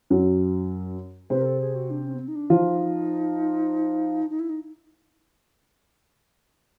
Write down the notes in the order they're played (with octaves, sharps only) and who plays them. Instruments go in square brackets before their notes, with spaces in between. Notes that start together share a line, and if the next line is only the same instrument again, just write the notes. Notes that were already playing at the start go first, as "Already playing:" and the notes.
[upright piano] F#2 F#3
[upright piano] C3 C4 [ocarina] B4
[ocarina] A#4
A4
G#4
F#4
D4
C#4
B3
C4
D#4
D4
[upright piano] F3 F4 [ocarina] D#4
[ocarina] D#4
E4
D#4